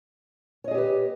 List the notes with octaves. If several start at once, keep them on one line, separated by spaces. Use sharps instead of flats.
G4 G#4 B4 C#5 D#5